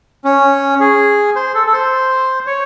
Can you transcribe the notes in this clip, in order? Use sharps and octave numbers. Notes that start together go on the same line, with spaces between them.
C#4
G#4
C5
A4
A4
C5
C#5